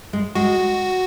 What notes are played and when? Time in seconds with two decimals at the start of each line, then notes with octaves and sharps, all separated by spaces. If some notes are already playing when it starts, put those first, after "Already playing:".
0.13 G#3
0.35 G#3 F#4